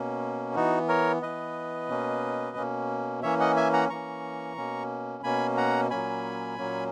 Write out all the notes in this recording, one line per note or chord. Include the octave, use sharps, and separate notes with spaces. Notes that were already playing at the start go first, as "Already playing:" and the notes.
Already playing: B2 A#3 C#4
E3 B3 D#4 F#4
A#4 C#5
E3 B3 B4 D#5
B2 A#3 C#4
B2 A#3 C#4
E3 A#3 C#4 C#5 E5
D#5 F#5
E5 G#5
F#5 A#5
E3 A#3 C#4 A#5 C#6
B2 A#3 C#4
B2 A#3 C#4 G#5 B5
F#5 A#5
A#2 F#3 A#3 C#4 G#5 B5
A#2 F#3 A#3 C#4